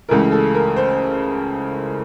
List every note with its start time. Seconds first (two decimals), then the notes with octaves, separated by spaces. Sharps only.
0.09 C#2 C#3 E3 A3 A#4
0.32 A4
0.55 A#4
0.76 C5